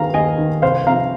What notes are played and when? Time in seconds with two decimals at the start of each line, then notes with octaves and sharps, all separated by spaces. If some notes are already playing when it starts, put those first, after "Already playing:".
Already playing: D#3 F5 A#5
0.14 D#2 D#5 G#5
0.38 D#3
0.62 C2 C5 F5
0.87 C3 F3 F5 A#5